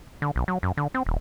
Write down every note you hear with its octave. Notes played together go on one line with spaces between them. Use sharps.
D3
B1
F#3
F#2
D3
C4
D#1